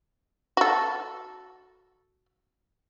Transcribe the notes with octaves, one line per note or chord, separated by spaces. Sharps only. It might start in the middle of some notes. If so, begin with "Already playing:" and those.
F#4 A4